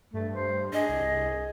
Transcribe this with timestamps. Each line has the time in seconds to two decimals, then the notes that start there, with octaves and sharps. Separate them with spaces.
0.14 G2 A3
0.35 C5
0.73 D4 G#4 D#5
0.89 C2